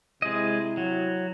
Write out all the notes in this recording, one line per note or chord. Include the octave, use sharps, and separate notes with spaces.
C3 G#3 E4 D#5
F#3